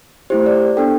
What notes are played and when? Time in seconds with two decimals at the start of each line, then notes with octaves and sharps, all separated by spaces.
0.30 A3 E4 G4 C5
0.46 D5
0.77 B3 D4 A4 G5